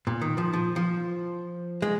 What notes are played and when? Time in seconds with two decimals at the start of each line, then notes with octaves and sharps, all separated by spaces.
0.07 A#2
0.22 D#3
0.38 F3
0.53 F3
0.76 F3
1.82 G#3